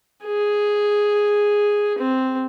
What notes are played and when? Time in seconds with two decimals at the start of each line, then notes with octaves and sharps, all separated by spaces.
0.25 G#4
1.98 C4